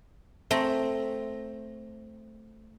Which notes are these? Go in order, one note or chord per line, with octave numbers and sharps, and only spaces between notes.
A3 C4 A#5